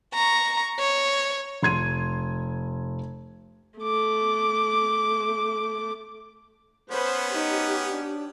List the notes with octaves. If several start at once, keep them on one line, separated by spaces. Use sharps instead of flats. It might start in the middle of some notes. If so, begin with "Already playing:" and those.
A#5 C#6
C#5
F1 C6 G#6 D#7
A3 D6
B3 C#4 B4 C5
D#4 G4
D4